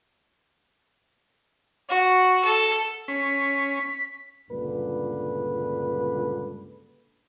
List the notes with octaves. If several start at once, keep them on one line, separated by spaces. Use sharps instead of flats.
F#4
A4
C#4 B6
C#2 G2 A#2 D3 B4